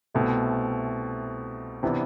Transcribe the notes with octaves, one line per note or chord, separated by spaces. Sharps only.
C2 B2 A3 C4
C3 E3 B3 D4